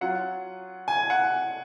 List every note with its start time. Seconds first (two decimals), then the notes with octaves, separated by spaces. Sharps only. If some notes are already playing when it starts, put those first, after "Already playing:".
0.01 F#3 C#4 F4 F#5
0.88 G#5
1.10 F#5